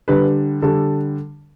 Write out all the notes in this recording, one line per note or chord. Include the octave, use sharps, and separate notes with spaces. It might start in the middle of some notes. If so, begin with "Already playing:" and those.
D3 G3 D4 B4
D3 G3 D4 A4